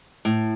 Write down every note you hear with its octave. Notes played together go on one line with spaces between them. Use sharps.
A2